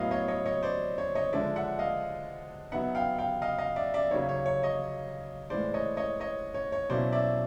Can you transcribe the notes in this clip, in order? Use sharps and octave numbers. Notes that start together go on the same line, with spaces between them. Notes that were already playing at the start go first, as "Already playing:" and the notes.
Already playing: A2 F#3 B3 E4 D#5 F5
C#5 D#5
C#5 D#5
C#5 D#5
C5 D5
C#5
C#5 D#5
D3 F3 G#3 D5 E5
E5 F#5
D#5 F5
F#3 B3 D#4 E5 F#5
F5 G5
F5 G5
D#5 F5
D#5 F5
D5 E5
D5 E5
C#3 F#3 A#3 D#4 C#5
C#5
C#5
C#5 D#5
A2 E3 G#3 C5 D5
C#5 D#5
C#5 D#5
C#5 D#5
C#5
C#5
B2 F#3 A#3 C#4 E4 C5 D5
D5 E5